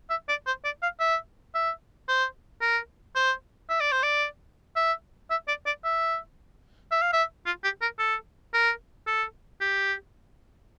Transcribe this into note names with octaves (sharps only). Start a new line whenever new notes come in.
E5
D5
C5
D5
F5
E5
E5
C5
A#4
C5
E5
D5
C5
D5
E5
E5
D5
D5
E5
E5
F5
E5
F4
G4
A#4
A4
A#4
A4
G4